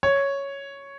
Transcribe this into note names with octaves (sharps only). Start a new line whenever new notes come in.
C#5